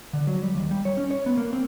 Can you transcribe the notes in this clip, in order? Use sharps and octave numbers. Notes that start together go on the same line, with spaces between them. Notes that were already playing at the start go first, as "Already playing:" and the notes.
D3
F#3
G3
D#2
G3
C#5
C#4
C#5
B3
A#3
C4